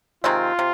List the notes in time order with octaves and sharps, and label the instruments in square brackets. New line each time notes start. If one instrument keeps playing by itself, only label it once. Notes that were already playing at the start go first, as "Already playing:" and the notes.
[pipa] C3 D#3 G#3 C4 [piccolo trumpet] F4
[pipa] C3